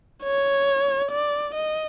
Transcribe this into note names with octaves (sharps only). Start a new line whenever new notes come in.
C#5
D5
D#5